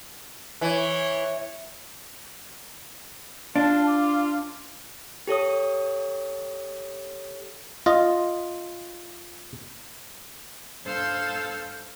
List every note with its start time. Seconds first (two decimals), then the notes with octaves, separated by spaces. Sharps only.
0.61 E3 C#5
3.56 D4 F4 A5
3.87 D6
5.27 G4 A4 C#5 D#6
7.86 F4 D#5
10.84 G2 A4 C5 F5 E6 G6